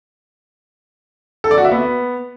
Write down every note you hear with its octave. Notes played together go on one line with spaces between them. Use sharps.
A4
D5
F#4
E5
B3